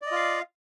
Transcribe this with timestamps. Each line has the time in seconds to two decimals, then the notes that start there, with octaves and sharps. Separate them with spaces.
0.02 D5
0.06 D#5
0.11 F4
0.16 F5